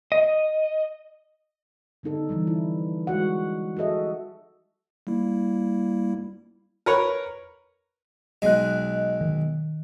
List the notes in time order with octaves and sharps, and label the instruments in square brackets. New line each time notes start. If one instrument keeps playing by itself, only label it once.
[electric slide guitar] D#5
[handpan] D3 B3 D#4 A4
E3 F3 G3
E4
G#3 F#4 F#5
F#4 G#4 A4 D#5 E5
[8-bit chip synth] G3 A#3 E4
[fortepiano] A#4 B4 C#5
[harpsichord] B1 G#3 [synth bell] D#5 F#6
[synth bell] D#3